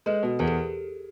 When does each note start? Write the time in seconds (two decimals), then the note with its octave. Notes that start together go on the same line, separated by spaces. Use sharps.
0.06 G#3 A4 B4
0.23 B2
0.39 E2 G#4 A#4
0.47 G4 A4